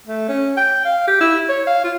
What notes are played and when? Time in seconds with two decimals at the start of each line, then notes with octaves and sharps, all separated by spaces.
0.08 A3
0.29 C#4
0.57 G5
0.85 F5
1.07 G4
1.21 E4
1.49 C#5
1.67 F5
1.84 F4